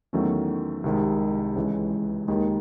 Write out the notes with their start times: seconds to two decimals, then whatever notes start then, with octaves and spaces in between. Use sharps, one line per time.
0.13 E2 D#3 F#3 A3 C#4
0.84 C2 C3 D#3 G#3
1.56 C#2 C#3 E3 G#3
2.28 D#2 D#3 G#3